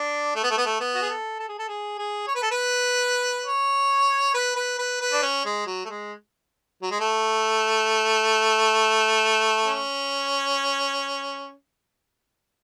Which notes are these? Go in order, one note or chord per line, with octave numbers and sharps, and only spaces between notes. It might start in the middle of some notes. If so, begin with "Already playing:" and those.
Already playing: D4
A3
B3
A3
B3
A3
B3
F#4
G#4
A4
A4
G#4
A4
G#4
G#4
C#5
B4
A4
B4
C#5
B4
B4
B4
B4
D4
C#4
G#3
F#3
A3
G#3
F#3
G#3
A3
C#4